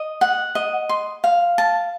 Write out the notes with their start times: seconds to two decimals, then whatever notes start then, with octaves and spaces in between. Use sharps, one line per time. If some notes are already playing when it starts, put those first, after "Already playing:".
Already playing: D#5
0.21 F#5
0.55 D#5
0.89 C6
1.24 F5
1.58 A5